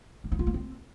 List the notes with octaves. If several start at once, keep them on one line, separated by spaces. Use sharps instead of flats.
D4
D#4
F4
A#3
C4